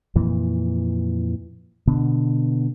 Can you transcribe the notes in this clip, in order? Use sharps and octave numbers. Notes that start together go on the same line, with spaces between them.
F2 A#2 E3
B2 D3 B3